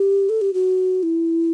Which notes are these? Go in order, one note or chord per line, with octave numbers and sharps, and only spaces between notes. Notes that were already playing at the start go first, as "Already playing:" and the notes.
Already playing: G4
A4
G4
F#4
E4